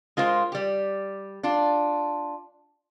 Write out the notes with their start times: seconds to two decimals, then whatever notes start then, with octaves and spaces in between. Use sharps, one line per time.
0.17 G#3 F4 A#4 C5
0.52 G3 G4
1.43 D4 F4